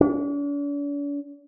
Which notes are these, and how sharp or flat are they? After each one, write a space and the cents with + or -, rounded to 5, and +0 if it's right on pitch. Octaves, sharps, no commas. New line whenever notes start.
D4 -45